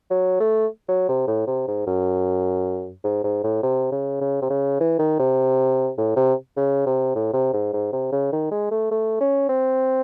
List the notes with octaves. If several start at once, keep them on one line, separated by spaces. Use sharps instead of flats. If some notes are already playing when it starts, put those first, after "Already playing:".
F#3
A3
F#3
C3
A2
C3
G#2
F#2
G#2
G#2
A2
C3
C#3
C#3
C3
C#3
E3
D#3
C3
A2
C3
C#3
C3
A2
C3
G#2
G#2
C3
C#3
D#3
G#3
A3
A3
C#4
C4